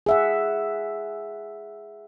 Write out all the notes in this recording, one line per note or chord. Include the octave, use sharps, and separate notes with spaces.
G#4 E5 F#5